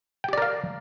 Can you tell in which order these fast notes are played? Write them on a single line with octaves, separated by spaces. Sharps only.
G5 G4 D5 A#4 F5